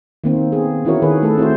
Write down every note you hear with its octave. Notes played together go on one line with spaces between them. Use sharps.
D#3 A#3 C4
B3 G#4
E3 C#4 E4 F#4 A#4 C#5
D#3 G#4 B4
A3 A4
C4 E4 F#4 C5